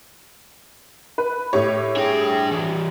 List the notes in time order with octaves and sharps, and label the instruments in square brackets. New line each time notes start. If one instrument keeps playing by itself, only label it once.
[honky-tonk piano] B4
A2 G4 C#5
[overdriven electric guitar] D4 G5 [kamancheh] G#4
[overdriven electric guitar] E3 G3